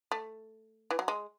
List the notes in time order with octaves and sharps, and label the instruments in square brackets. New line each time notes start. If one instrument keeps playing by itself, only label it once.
[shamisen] A3
E3
F#3
G#3